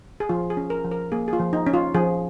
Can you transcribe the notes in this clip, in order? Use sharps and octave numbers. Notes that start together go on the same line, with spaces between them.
G#4
F3 F4
G#4
C#4
A#4
F3
A#4
A#3 G#4
G#4
F4
F3
D#4
C#4
F4
F3 G#4